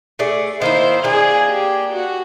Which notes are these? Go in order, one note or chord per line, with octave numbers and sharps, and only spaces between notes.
A3 G#4 D5
D#3 A#3 E4 C5
A#3 D4 G#4
G4
F#4